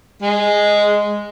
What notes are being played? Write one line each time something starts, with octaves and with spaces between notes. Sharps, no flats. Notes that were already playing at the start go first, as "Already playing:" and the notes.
G#3